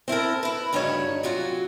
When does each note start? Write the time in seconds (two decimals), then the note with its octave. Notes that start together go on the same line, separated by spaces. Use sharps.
0.08 C4 E4 A4 A#4
0.43 E4 B4
0.73 D2 G2 C#3 G3 D#4 C#5
1.23 C3 F#3 F4 F#4